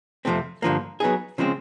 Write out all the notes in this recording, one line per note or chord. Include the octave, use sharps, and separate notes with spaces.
F2 C3 F3 A3 C4
G2 D3 F3 A#3
F#3 B3 D#4 G#4
C#3 F3 G#3 C4